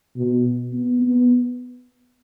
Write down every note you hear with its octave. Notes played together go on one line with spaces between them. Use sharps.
B2
B3
B3